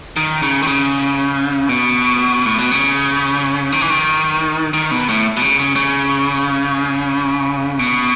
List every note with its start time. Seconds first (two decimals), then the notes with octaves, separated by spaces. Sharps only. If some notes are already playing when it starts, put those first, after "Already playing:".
0.17 D#3
0.43 C#3
0.63 D#3
0.68 C#3
1.69 B2
2.46 A2
2.59 B2
2.71 C#3
3.72 D#3
3.81 E3
3.90 D#3
4.73 D#3
4.91 B2
5.09 A2
5.37 B2
5.42 C#3
5.59 C#3
5.76 C#3
7.79 B2